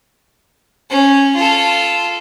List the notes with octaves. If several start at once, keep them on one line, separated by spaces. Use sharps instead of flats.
C#4
F4 A4